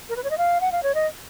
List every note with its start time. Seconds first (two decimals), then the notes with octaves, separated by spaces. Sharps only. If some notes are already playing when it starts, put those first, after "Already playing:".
0.09 A#4
0.16 B4
0.24 C#5
0.30 D#5
0.38 F5
0.61 F#5
0.72 F5
0.83 C#5
0.95 D#5